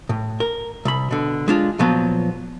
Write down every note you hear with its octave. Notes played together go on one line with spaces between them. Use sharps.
A2
A#4
C2 B5
B2 D3
G#3 D4 F4
A#2 F3 F#3 B3